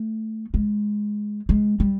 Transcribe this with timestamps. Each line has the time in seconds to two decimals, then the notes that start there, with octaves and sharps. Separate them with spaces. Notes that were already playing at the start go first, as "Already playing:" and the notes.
Already playing: A3
0.54 G#3
1.49 G#3
1.80 G3